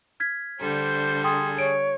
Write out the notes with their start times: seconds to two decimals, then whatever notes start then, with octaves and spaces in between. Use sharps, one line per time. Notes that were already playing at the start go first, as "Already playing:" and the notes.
0.20 F6 G#6 B6
0.60 D3 G3 A4 C5
1.24 G#4 G5 C6 D#6
1.58 C#5 D7